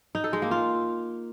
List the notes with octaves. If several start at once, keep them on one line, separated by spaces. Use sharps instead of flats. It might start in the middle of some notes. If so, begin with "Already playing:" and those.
D#4
A4
G#3
A#3
F4